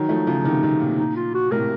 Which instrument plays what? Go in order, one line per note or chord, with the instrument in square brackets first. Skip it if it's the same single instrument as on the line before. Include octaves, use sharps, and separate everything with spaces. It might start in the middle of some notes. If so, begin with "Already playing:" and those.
Already playing: [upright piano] D#3 F#3 [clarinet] D#4
[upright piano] F3 A3
C#3 F3
C3 D#3
C3 D#3
A#2
[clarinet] D#4
F4
F#4
[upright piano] A2 C3 [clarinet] A#4